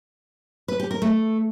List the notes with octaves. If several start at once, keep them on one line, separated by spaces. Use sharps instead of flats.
B4
G4
A#4
A3